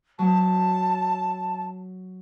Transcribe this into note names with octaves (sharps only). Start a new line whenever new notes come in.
F#3 A5